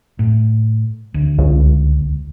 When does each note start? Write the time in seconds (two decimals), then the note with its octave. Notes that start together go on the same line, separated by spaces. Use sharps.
0.19 A2
1.14 D2
1.38 C#2